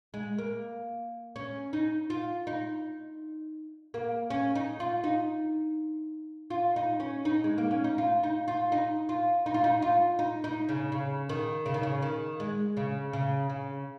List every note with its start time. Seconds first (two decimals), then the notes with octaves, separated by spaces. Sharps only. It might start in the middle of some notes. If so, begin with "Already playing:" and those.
0.14 G#3
0.38 A#3
1.36 C#4
1.73 D#4
2.10 F4
2.47 D#4
3.94 A#3
4.30 C#4
4.55 D#4
4.80 F4
5.04 D#4
6.50 F4
6.76 D#4
7.00 C#4
7.25 D#4
7.44 G#3
7.58 A#3
7.71 C#4
7.84 D#4
7.98 F4
8.23 D#4
8.48 F4
8.72 D#4
9.09 F4
9.46 D#4
9.54 F4
9.64 D#4
9.82 F4
10.19 D#4
10.44 D#4
10.69 C#3
10.92 C#3
11.29 D#3
11.66 C#3
11.74 D#3
11.83 C#3
12.02 D#3
12.40 G#3
12.77 C#3
13.13 C#3
13.50 C#3